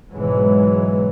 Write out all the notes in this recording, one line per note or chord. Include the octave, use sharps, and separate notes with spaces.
G#2 B2 E3 F#3 G#3